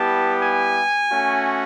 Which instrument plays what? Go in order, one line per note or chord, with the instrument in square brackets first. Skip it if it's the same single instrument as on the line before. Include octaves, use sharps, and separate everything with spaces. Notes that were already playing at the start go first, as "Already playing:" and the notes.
Already playing: [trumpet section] G3 B3 E4 G4 A5
G#5
A3 C#4 F#4